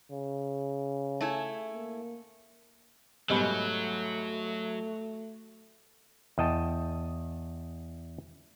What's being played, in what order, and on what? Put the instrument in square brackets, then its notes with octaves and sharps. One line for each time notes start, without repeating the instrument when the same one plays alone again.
[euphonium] C#3
[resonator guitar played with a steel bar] A3 E4 G#5
[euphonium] A#3
[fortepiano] G#2 B2 G3 [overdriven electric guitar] F#3 [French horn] A3
[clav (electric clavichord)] E2 D#5 G5 A5